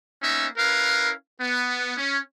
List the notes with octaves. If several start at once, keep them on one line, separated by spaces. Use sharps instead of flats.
A#3 B3 C#4 D#4 E5
C#4 E4 A#4 B4 F5
B3
C#4